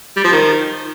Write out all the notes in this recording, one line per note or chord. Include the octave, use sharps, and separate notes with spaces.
G3
F3
D#3